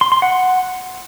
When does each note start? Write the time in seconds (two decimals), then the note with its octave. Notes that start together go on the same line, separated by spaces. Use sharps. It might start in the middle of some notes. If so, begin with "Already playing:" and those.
0.01 C6
0.12 C6
0.22 F#5